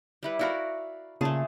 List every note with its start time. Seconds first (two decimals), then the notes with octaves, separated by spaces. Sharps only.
0.23 G3 E4 B4
0.39 E4 F#4 A#4 D5 F5 B5
1.21 A#2 C#3 A3 G#4 A5